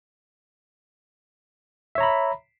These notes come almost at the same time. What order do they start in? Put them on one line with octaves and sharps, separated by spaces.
E5 C#5 A#5 B5